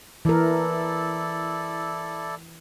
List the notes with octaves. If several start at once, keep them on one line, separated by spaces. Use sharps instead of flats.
E3 E4 A4 A#4 D5